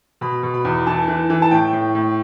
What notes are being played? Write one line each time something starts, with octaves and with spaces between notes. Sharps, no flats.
B2 B5
B2
B5
E2
E3 A5
E3
E3
A5
A2 G5
A2
A2